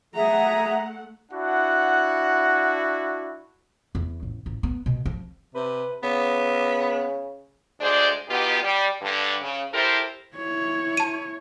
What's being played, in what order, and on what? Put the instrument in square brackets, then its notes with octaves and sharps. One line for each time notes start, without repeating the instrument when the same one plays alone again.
[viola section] A3 F#5 [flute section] G#4 E5 [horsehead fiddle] A#5
[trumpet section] D4 E4 F#4 [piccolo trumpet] F#5
[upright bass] E2
A1
A1
B3
B2
F3
[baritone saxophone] C3 [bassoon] B4
[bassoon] C#3 [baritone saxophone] B3
[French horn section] D2 G#3 D4 G#4 C5 D5
B2 B3 D#4 F4 G4
G3
G2 D3
C#3
E4 G4 A4 A#4 C5
[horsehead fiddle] E4 C#5
[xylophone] A5 D#7